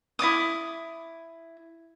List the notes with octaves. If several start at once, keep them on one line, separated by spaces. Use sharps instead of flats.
E4 D5 D6 D#6